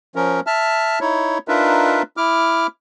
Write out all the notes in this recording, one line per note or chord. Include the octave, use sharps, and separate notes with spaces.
F3 C#4 A#4
E5 A5 F6
D#4 E4 C#5
D4 D#4 F4 A#4 B4 E5
E4 D6 F6